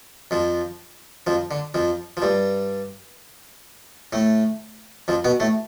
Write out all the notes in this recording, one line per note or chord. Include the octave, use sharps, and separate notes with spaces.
F2 F3
F2 F3
D3
F2 F3
F3
G2 G3
A2 A3
F2 F3
B2 B3
A2 A3